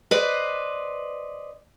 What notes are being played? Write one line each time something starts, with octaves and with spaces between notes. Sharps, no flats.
B4 C5 D5 D#5